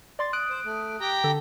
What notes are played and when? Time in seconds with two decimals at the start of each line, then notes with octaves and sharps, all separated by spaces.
0.19 D5 C6 A6
0.33 D#6 F#6 D7
0.50 C5
0.65 A3
1.00 G4 G5 A#5
1.24 D3 A4